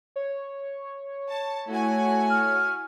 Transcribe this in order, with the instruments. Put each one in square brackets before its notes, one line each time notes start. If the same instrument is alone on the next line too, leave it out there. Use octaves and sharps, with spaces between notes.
[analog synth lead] C#5
[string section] A5
[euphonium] A3 [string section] E4 F#4 G#5
[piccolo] F6